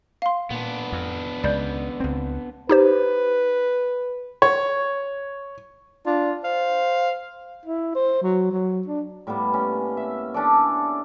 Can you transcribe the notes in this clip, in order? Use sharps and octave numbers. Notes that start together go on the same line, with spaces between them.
F5 C6
A#2 B3 D4
F2
C#2 D5 G6
C#2 C4
D#4 G4 B4 C5
C#5
D4 F4
C5 F5
E4
C5
F#3
F#3
D4
A2 G3 A#3 B3
C#4
E5
C#4 D4 A4 D5